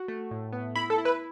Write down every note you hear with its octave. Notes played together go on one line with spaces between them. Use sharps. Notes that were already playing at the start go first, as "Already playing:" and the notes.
Already playing: F#4
A3
A2
B3
E4 B5
A4
E4
B4